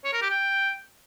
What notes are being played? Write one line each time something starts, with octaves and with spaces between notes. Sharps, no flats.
C#5
A#4
G4
G5